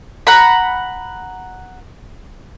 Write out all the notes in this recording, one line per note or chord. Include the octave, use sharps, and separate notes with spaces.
F#5 A#5 B5